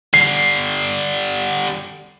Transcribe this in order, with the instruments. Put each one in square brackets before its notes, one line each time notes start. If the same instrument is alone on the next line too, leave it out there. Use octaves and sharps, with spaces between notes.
[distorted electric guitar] D3 G3 [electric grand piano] C7